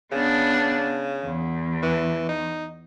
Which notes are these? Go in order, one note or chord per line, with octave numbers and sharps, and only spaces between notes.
C#3 B3 D4
E2
E3
D#4